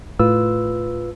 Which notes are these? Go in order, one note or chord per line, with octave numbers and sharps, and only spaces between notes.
A2 F4 B4 E6